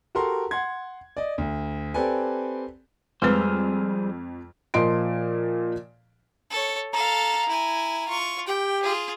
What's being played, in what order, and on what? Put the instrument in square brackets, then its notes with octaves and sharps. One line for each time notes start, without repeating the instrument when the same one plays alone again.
[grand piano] F#4 G4 A4 A#4 C6
F#5 C6 G#6
D5 D#5
D2
C4 G4 A4 B4 D5 G#5
[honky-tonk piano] F2 E6 F6 [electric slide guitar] G3 G#4 C5 [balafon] G#3 B4
[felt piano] A#2 F3 D#5 C6 D7
[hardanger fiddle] A4 C#5
[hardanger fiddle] A4 F5 [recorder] A#5
[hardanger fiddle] E4 G#5
F4 C#6
[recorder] G4 [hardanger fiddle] G5
[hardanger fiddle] F4 G#4